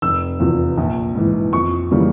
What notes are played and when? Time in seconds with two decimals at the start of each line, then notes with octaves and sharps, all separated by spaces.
0.02 F1 E6
0.40 E2 C3 F3
0.77 A#1
1.15 G#2 E3
1.53 F2 C#6
1.91 C#3 E3 G3 A#3